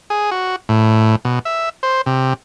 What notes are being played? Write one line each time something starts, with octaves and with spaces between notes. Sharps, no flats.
G#4
F#4
A2
B2
E5
C5
C3